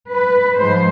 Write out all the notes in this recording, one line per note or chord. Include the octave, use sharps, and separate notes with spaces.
B4
G#2 F3 G#3 C5